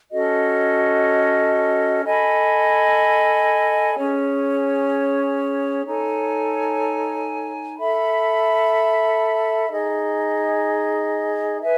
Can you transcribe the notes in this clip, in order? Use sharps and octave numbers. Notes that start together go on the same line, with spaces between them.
C#4 F#4 A4 D#5
A4 D#5 G#5 B5
C#4 G#4 C#5
D#4 A4 C#5 G#5
A4 E5 B5
D#4 G#4 D#5
B4 E5 G#5